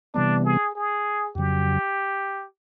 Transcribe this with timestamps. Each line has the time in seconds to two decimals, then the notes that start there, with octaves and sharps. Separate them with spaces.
0.14 C3 E3 G3 B3 D4
0.44 G#4
0.75 G#4
1.35 F2 C#3 F#3 G4